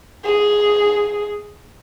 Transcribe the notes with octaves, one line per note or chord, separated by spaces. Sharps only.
G#4